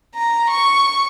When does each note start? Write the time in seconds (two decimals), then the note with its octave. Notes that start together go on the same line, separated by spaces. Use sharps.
0.14 A#5
0.50 C#6